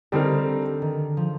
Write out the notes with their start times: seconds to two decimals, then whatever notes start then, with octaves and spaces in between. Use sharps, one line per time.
0.12 D3 G3 C4 D#4 A#4
0.82 D#3
1.17 F3